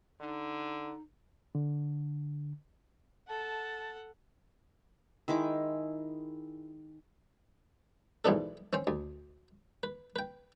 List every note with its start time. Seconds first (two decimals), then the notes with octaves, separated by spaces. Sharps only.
0.20 D3 D#4
1.55 D3
3.28 A4 F#5 A5
5.28 D#3 G#3 E4 D6
8.25 B1 G#2 E3 B3 D4 A4
8.73 C4 C#4 C5
8.87 D2
9.83 B4
10.16 B4 G5